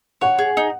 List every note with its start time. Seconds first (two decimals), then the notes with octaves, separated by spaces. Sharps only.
0.21 C#5 F#5
0.39 G#4
0.57 D#4